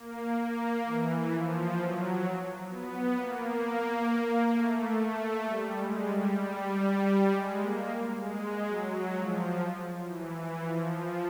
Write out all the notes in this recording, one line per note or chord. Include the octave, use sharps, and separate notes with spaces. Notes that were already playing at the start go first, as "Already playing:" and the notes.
Already playing: A#3
A#3
E3
F3
F#3
B3
A#3
A3
A3
G3
G#3
G3
G3
G#3
A#3
G#3
F#3
F3
E3
E3
F3
F3